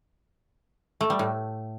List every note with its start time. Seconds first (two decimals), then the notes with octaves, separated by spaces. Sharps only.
1.01 A3
1.10 G3
1.19 A2